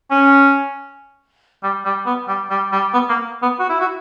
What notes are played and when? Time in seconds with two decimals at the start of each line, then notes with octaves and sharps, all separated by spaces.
0.11 C#4
1.63 G3
1.85 G3
2.06 B3
2.28 G3
2.50 G3
2.72 G3
2.94 B3
3.09 A#3
3.42 B3
3.59 F#4
3.69 E4
3.81 F#4